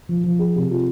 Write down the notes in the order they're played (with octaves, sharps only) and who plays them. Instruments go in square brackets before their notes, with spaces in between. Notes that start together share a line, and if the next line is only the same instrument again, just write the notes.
[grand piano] F3
F3
G#4
C3
F4